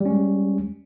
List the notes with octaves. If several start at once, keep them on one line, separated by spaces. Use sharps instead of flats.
G3 G#3 C#4